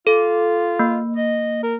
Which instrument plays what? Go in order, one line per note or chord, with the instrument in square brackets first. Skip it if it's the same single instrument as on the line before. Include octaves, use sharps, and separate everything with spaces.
[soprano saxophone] F4 [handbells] A4
[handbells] A#3
[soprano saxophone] D#5
A#4